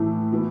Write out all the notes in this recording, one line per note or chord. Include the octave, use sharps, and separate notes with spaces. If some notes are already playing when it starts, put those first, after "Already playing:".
Already playing: A2 E3 A3
E3 B3